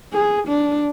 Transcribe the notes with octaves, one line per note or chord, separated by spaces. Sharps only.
G#4
D4